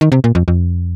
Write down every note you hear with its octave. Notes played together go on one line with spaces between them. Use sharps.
D#3
C3
A#2
F2
F2